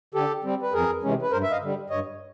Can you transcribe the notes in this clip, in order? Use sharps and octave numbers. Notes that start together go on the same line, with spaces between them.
D3 G4 A4
G3 C4
B4
F2 G#4 A#4
C3 E3 G#3 C#4
B4
G2 A#4 C5
E5
D#5 F5
D3 G3
G2 C#5 D#5